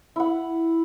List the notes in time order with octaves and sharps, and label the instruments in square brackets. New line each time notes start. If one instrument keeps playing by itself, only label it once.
[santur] E4 F#5